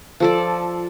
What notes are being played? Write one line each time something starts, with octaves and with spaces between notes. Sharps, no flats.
F3 A4 D5